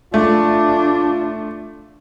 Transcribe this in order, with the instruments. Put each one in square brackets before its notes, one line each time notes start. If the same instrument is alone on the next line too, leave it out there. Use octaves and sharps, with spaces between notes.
[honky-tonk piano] A3 [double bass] D4 [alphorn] F4